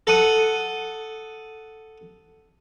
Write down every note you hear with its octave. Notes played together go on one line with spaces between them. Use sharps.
A4 F#5 D#6